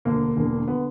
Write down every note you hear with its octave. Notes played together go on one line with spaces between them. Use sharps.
E1 D2 D3 A#3
E1 E2 D3
D3 B3